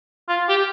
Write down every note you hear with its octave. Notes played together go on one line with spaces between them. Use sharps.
F4
G4